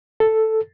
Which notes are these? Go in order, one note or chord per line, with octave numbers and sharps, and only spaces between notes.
A4